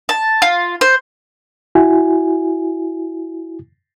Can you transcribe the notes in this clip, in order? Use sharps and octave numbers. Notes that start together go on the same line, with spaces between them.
A5
F4
C5
E4 F#4 G#5